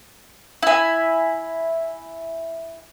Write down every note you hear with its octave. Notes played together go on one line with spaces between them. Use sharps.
E4 G#5